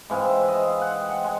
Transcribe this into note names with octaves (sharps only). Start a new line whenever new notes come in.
G#2 E3 G#3 C4 F5
E5
D#5 E5
F5
F#5
G5
F#5
G#3 G#5